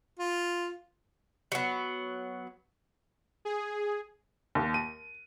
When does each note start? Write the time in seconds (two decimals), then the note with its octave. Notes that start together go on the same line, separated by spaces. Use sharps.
0.19 F4
1.52 F#3 B3
3.45 G#4
4.55 D#2
4.74 D#7